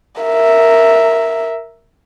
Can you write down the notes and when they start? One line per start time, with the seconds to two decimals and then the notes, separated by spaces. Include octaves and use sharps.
0.22 A#4 E5